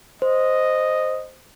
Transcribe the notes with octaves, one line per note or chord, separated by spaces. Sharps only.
C5 D#5